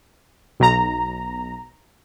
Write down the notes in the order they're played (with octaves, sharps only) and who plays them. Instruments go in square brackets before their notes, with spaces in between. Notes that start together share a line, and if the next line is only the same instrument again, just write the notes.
[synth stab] B1 A#5